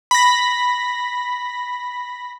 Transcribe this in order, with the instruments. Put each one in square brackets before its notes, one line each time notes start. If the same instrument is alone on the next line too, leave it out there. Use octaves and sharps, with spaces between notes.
[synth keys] B5 A#6